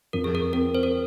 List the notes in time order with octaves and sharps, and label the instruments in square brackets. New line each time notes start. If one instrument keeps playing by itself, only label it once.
[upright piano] F2 [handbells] A#4
[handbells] G#4
A#4
[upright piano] C4 [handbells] A#4
[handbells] C5
A#4